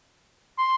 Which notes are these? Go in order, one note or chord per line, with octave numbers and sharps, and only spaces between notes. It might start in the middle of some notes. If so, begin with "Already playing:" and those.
C6